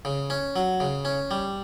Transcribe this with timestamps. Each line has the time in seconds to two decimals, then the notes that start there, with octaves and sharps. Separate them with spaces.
0.05 C#3
0.30 C#4
0.56 F#3
0.80 C#3
1.05 C#4
1.31 G3